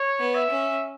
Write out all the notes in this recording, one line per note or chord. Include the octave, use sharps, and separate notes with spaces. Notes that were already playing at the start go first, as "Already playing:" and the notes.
Already playing: C#5
B3
E5
C#4